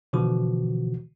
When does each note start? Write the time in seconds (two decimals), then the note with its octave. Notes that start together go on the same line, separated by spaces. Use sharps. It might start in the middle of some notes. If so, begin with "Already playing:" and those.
0.13 B2 D3 E3 F3 F#4